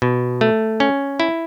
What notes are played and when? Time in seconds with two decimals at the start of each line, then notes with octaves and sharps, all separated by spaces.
0.02 B2
0.41 A3
0.80 C#4
1.20 E4